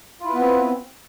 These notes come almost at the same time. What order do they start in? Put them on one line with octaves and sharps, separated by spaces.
F4 E4 B4 B3 C4